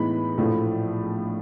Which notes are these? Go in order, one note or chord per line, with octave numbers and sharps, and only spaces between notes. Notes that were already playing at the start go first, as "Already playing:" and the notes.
Already playing: A2 E3 G#3 B3 D#4 B5
A#1 A2 F3 A3